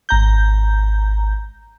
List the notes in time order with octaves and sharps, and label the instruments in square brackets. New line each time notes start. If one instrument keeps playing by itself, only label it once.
[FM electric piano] G#1 A#5 G6